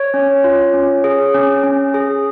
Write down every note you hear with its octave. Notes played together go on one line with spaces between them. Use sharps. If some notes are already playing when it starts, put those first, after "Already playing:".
Already playing: C#5
C#4
F4
C#4
G#4
C#4
C#4
G#4